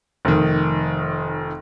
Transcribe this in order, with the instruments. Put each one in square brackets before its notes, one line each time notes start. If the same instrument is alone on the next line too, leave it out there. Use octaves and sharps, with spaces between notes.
[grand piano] F1 D#3